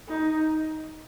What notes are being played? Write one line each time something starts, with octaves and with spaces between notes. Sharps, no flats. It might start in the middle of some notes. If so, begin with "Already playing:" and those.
D#4